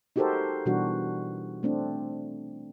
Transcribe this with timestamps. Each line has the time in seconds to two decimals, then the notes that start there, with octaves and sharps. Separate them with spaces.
0.16 D#4 F#4 G4 A4 A#4 C5
0.66 B2 E3 G3 D4 F#4
1.63 A3 C4 D4